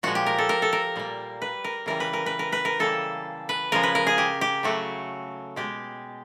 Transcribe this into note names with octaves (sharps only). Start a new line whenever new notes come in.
A#2 F3 G#3 F#4
G4
A#4
A4
A#4
A4
A#4
A#2 G3 A#3
B4
A#4
C#3 E3 G3 A#4
B4
A#4
B4
A#4
B4
A#4
C#3 E3 G3 A#3 A4
B4
C#3 F3 G#3 A#4
B4
A#4
G#4
G4
G4
C#3 F#3 A3 F#4
B2 G#3 G4